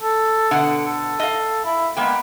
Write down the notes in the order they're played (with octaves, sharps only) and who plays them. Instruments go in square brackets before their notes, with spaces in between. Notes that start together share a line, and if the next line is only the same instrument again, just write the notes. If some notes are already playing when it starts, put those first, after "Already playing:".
[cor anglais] A4
[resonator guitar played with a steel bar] B2 D3 F#5
[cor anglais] A4
[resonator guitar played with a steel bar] D#5 F5
[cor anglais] E4
[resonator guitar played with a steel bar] G#3 A#3 G5 [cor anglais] B3